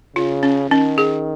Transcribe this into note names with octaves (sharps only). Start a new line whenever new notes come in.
C#3 F4
C#4
D#3 C#4
G#4